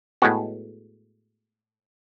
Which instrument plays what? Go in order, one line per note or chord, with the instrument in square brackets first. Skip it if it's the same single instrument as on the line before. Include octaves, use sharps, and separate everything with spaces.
[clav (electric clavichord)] A2 G#3 B3 F#4